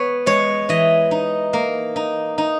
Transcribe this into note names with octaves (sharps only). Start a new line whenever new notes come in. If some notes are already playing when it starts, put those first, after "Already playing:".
Already playing: B3 B4 C#5
G#3 C#5
E3 D#5
D#4
A#3
D#4
D#4